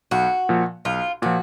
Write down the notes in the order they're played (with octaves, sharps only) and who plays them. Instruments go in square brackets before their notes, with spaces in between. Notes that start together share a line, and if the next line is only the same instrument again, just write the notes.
[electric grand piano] B1 [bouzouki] F#4
[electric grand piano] A#2 F3
[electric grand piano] B1 [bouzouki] F4
[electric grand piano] A#2 F3 [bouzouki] F#4